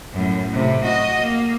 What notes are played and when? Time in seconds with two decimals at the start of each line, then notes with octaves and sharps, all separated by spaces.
0.13 F#2 A2
0.53 A2 C3
0.84 F#4 D#5
1.21 A#3